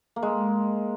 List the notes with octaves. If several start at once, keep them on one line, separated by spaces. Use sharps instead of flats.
A#3
G#3